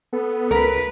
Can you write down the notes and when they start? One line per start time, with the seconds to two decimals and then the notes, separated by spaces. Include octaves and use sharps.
0.13 B3 A4
0.51 C#2 A#4 B4